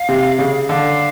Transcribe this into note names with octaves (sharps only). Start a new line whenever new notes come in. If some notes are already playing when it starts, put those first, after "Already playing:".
Already playing: F5
C3
C#3
D3 F5